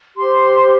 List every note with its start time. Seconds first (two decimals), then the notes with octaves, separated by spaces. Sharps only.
0.17 G4 C5 C6